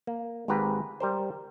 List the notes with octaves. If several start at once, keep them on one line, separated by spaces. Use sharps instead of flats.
A#3
G#1 G#2 G4 B4 A#5
G3 A#4 C5